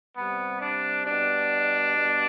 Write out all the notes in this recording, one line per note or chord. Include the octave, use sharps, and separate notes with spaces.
C3 G3 B3
D4
B2 G3 D4
B2 G3